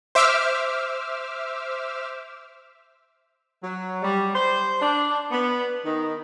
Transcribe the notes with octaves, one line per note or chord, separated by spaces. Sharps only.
C5 E5 D6 E6 F6
F#3
G3
C5
D4
B3
D#3